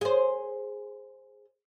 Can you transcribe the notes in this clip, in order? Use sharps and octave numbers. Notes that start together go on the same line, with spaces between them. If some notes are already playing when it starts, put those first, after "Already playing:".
G#4 C5